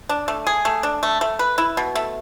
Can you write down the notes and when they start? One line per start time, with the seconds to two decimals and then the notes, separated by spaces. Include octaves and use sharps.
0.09 D4
0.28 A3
0.47 G#4
0.65 A3
0.83 D4
1.03 A3
1.21 A3
1.39 B4
1.58 E4
1.77 B2
1.95 A3